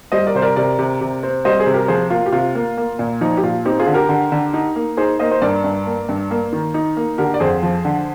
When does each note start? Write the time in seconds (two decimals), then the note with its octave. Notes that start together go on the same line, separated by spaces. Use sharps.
0.12 G3 C5 D#5
0.27 A#4 D5
0.35 C3 C5
0.42 A#4 D5
0.56 C3 A#4 D5
0.79 C3
1.01 C3
1.23 C4
1.45 G3 C5 D#5
1.59 G#4 C5
1.66 C3
1.74 G4 A#4
1.88 F3 G#4 C5
2.10 A#3 F4
2.26 G4
2.32 C3 F4
2.55 A#3
2.77 A#3
2.99 A#2
3.21 F3 D#4
3.37 G4
3.43 A#2 F4
3.65 C4 D#4 G4
3.80 F4 G#4
3.87 D3
3.94 G4 A#4
4.09 D3
4.32 D3
4.53 D#4
4.76 A#3
4.97 D#4 G#4 C5
5.20 A#3 C5 D#5
5.31 C5
5.42 G2 A#4 D5
5.64 G2
5.86 A#3
6.09 G2
6.31 A#3
6.53 D#3
6.74 D#4
6.97 A#3
7.18 D3 G4 A#4
7.34 D5
7.40 F2 G#4 C5
7.63 F3
7.85 D3